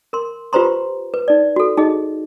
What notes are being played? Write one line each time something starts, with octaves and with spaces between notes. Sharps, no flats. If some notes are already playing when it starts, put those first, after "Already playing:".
A#4 C6
F4 G4 B4 C5 A#5 C6
B4
D#4 D5
F#4 A4
D#4 G#4 D#5